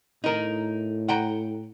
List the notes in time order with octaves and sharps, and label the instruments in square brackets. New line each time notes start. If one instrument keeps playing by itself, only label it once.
[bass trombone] A2 [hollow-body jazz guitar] D#4 A#4
[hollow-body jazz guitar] F#5 G5 A#5